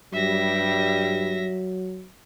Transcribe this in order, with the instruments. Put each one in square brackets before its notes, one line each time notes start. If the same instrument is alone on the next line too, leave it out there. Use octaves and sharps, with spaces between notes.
[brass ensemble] G2 G3 [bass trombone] F#3 [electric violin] E5 A#6